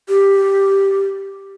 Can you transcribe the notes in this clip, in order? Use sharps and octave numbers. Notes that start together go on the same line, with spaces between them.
G4